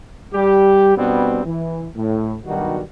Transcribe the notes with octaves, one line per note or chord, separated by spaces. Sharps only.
G3 G4
B2 G3 B3 C4 D4 G4
E3
A2
B1 G2 D#3 G3 F#4